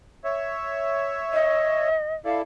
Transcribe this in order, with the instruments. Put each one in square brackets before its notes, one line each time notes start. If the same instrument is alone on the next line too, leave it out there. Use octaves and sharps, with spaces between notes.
[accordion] C#5 E5
[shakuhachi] D#5
[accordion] E4 A4 D5 [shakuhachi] F5